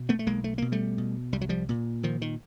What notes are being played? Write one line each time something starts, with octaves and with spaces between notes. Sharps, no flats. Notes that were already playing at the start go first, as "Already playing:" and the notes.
Already playing: B2
A3 B3
A3
B1 G#3 A#3
A3
B2 A#3
G3 A3
B2
C2 G3
F#3
F3 G3
A#2
A#2 D#3 F3
D#3